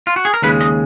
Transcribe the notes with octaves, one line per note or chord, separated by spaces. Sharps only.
F4
F#4
G#4
A#4
D#2 C#3 G#3 B4
D#5